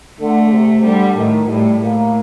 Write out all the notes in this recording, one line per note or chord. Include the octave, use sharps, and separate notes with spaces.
D3 A3
C3
D3 G3
A2 D#3
A2 G3
A2 A#3